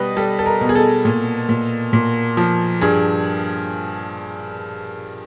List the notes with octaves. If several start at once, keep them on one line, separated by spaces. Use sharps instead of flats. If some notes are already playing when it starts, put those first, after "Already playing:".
Already playing: B2 G3 B4 D#5
G3 A4
A4
A#4
B2
G#4
A4
A#2
A#2
A#2
F3
G2 G#4